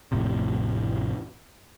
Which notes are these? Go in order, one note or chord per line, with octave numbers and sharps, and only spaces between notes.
A1 F2 A2 C3